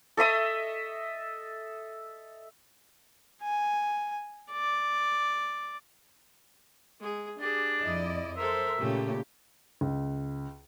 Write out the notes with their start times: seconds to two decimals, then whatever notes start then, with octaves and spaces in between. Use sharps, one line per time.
0.17 A4 D#5 E5 D#6
3.42 G#5
4.51 D5
6.99 G#3 G#4
7.39 D4 G4 G#4
7.83 F2 E4 D5 D#5
8.37 A4 A#4 C5 E5
8.80 A#2 C#3 A3 G4
9.81 C#2